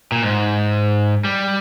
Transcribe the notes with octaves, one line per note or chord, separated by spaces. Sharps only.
A#2
G#2
G3